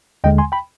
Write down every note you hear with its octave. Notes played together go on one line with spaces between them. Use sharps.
D#2 D3 G#3 D#5 G5
G#5 C6
G5 B5